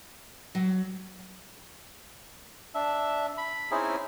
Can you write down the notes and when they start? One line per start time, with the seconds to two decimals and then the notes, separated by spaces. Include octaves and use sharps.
0.55 F#3
2.75 D4 E5
3.38 B5
3.71 C4 C#4 D#4 E4 G#4